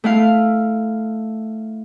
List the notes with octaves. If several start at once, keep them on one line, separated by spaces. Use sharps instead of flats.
A3 E4 F5